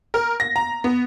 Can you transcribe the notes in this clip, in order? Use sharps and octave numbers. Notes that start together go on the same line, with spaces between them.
A#4
A#6
A#5
B3